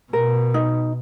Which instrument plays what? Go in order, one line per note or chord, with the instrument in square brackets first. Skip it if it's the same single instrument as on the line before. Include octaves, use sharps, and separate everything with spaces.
[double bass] B2 [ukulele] A#4
[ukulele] D#4